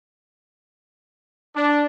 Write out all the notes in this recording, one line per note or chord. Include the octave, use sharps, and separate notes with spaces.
D4